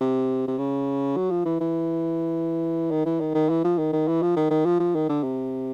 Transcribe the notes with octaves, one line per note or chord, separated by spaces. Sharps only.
C3
C3
C#3
F#3
F3
E3
E3
D#3
E3
D#3
D#3
E3
F3
D#3
D#3
E3
F3
D#3
D#3
F3
F3
D#3
D3
C3